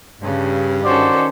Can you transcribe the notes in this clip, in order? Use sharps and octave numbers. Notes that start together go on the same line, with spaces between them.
G2 C#3
D#3 C#4 F#4 A4 C5 D5